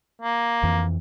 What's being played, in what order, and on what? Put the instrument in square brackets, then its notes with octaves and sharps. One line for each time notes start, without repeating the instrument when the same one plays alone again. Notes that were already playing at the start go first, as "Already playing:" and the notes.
[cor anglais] A#3
[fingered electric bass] F2 E3